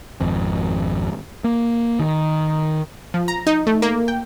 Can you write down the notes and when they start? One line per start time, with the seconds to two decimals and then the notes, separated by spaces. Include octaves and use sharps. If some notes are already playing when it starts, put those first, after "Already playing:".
0.20 G#1 F2
1.44 A#3
1.99 D#3
3.14 F3
3.28 A#5
3.47 D#4
3.67 A3
3.82 A#3
4.08 G5